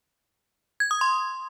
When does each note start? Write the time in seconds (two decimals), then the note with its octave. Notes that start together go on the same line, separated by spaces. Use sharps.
0.80 G#6
0.91 D#6
1.01 C6